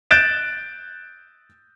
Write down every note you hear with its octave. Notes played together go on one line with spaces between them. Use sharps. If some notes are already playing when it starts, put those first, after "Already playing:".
F#6 G6 A6 D7 E7